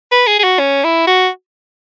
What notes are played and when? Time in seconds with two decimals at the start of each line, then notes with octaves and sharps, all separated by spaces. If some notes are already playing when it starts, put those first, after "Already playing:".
0.12 B4
0.27 G#4
0.39 G#4
0.44 F#4
0.59 C#4
0.84 E4
1.07 F#4